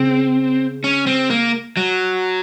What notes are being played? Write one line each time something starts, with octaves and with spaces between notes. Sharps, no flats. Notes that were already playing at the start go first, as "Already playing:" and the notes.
Already playing: C#3 C4
C#4
C4
A#3
F#3